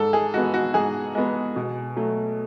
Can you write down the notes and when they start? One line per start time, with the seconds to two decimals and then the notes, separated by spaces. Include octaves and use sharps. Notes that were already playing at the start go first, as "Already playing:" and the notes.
Already playing: G#2 A4
0.13 G#4
0.34 G#3 B3 F#4
0.54 F#4
0.74 G#2 G#4
1.15 G#3 B3
1.56 B2
1.96 F#3 A3